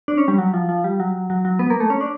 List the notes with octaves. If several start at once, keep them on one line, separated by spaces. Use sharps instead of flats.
D4
C#4
G3
F#3
F3
F3
G3
F#3
F#3
F#3
B3
A#3
A3
C#4
D4